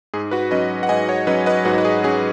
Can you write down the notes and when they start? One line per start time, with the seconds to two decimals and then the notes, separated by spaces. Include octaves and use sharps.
0.14 G#2 G#4
0.31 F#4 B4
0.51 F#3 C#4 B4 D#5
0.83 F#5
0.89 G#2 D#5 G#5
1.08 C#5 F#5
1.27 F#3 C#4 B4 D#5
1.46 B4 D#5
1.65 G#2 F#4 B4
1.78 B4
1.85 G#4
2.04 F#3 C#4 G#4